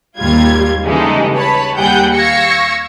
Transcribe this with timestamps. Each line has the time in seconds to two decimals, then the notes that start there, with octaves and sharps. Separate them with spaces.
0.18 D#2 G#2 G3 F4 G#6
0.83 C#3 E3 G3 G#3 D#4 A4
1.34 B4 C#5 A5 B5
1.77 D#2 G3 G#4 F#5 G5 G6
2.14 F5 C#6 E6 G#6 A#6 C#7